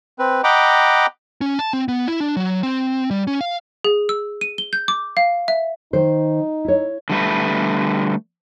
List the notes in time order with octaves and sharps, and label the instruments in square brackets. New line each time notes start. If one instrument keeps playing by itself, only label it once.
[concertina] C4 B4
D#5 F#5 G5 A#5 B5 D6
[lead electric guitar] C#4
A5
C4
B3
E4
D4
F#3
C4
G3
C#4
F5
[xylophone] G#4
E6
D#7
G7
G6
D6
F5
E5
[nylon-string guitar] D#3 C5 [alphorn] D#4
[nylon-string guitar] E4 C#5
[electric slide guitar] D3 G3 A3 B4